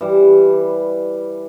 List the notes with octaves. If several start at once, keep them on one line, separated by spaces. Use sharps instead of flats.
E3 G3